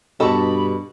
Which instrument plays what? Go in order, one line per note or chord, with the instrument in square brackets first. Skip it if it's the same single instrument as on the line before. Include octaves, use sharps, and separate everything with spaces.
[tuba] G2 [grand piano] B2 A5 C#6 [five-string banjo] G4 A4 D#5 [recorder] B5